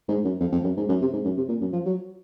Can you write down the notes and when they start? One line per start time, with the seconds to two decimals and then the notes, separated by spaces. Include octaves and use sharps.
0.08 G#2
0.25 F#2
0.40 F2
0.52 F2
0.64 F#2
0.77 G#2
0.89 F#2
1.01 C3
1.13 G#2
1.24 F#2
1.37 C3
1.49 A#2
1.61 F#2
1.73 F3
1.86 F#3